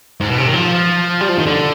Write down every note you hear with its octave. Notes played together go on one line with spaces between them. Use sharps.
G#2
B2
C3
D#3
F3
G3
F3
D#3
D3